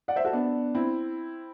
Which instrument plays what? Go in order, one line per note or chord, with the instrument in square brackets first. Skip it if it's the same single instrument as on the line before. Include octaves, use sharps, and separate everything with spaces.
[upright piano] D5 F#5
C5 E5
F#4 A4
B3 D4
C4 E4